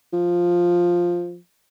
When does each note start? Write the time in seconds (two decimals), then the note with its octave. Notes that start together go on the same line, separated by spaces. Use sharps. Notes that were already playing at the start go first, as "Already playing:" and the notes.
0.13 F3